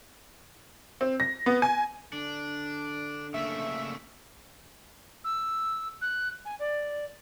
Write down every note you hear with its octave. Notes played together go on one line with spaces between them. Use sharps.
C4
A#6
B3
G#5
D3 D4
C#3 A3 A#3 E5
E6
F#6
G#5
D5